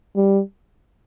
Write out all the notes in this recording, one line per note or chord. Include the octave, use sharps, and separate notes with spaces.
G3